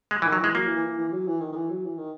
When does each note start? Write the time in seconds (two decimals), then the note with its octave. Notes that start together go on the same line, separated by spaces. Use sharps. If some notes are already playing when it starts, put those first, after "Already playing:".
0.11 G#3
0.22 E3
0.25 D#3
0.32 F#3
0.40 E3 G#3
0.54 F#3 A#3
0.65 E3
0.76 E3
0.86 E3
0.98 E3
1.12 F#3
1.27 E3
1.41 D#3
1.52 D#3
1.55 E3
1.70 F#3
1.85 E3
1.98 D#3